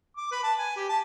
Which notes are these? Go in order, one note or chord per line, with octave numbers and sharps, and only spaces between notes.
D6
B4
A5
G#5
G4
A5